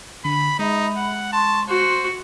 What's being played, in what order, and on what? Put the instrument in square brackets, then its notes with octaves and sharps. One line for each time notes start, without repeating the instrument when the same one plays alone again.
[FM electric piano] D3 [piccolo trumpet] B5
[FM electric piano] G#3 [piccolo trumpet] D#4 [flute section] E5 B5
[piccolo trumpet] F#5
[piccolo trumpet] A5 [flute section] C6 C#6
[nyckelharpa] F#4 [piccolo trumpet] C5 [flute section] C6